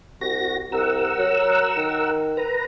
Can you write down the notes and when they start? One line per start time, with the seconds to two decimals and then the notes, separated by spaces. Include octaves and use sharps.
0.21 C2 F#4 A#6
0.72 C2 A#4 F#5 E6
1.19 F#3
1.77 D#3
2.37 B4 A#5